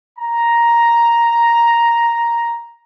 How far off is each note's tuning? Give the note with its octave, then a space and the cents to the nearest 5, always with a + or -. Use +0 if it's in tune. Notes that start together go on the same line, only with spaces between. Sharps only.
A#5 +5